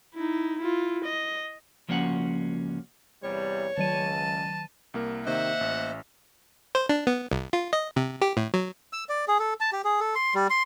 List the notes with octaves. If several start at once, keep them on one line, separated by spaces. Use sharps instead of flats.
D#4 E4
E4 F4
D#5
C#2 F3 A#3 C#4 F#4 F#5
E2 C3 G3 C#5
C#2 D#3 F#3 A5 D#7
C2 A#3 A#4
C3 D#3 A#3 C5 D#5 E5 F#5
A1
C5
D4
B3
C2
F4
D#5
C3
G4
A2
F#3
E6
D5
G#4
A4
A5
G4
G#4
A4
C6
G3
C6